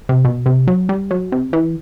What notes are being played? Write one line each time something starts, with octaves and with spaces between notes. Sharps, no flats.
C3
B2
C3
F#3
G3
F#3
C3
E3